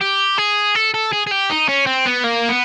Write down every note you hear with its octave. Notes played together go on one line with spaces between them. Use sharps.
G4
G#4
A4
A4
G#4
G#4
G4
D#4
C#4
C4
B3
A#3
B3